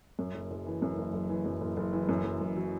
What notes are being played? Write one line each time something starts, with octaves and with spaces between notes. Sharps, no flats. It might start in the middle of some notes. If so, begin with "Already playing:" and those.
F#2
F#1
F#1
E3
F#2
F#1
F#1
E3
F#2
F#1
F#1
E3
F#2
F#1
F#1
F#3